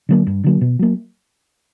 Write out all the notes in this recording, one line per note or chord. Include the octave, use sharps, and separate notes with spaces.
D3 F#3 A#3
G2
D3 F#3 A#3
B2
F#3 A#3